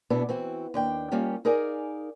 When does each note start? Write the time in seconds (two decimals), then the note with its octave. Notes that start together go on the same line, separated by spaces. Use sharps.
0.10 B2 B3 D4 E4
0.29 E3 C4 F#4
0.74 D#2 D4 G5
1.11 G3 A#3 C#4 F4 G4
1.45 D#4 G#4 A#4 D5 F5 G#5